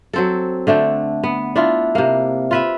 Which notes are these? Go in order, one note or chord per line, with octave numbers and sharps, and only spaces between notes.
F#3 C4 A4
D3 A3 D4 G5
B3
D4 E4 F4
C3 A#3
F4 B4 E5